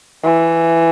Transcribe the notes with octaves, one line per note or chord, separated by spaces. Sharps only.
E3